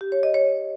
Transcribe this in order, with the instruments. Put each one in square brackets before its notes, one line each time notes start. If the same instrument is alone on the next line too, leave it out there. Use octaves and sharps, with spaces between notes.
[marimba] G4
C#5
D#5
C#5